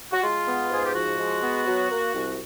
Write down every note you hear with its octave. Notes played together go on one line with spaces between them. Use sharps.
F#4
G#3 F4
B3
G#2 G#4
G4
F3 F#4
G#3
B3
F#3
A#3
C2